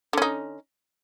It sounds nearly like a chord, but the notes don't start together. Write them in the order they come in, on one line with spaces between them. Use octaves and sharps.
D3 C#4 D#4